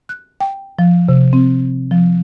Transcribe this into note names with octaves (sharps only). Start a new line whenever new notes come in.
F#6
G5
F3
C3
C4
F3